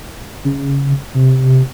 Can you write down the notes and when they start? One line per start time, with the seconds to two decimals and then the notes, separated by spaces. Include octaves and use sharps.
0.45 C#3
1.14 C3